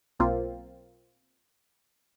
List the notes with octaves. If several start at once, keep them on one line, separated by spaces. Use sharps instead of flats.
B1 A#3 C4 F4